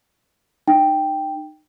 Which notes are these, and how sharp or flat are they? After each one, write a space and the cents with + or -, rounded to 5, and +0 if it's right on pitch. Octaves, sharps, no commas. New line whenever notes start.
D#4 -30 G5 +0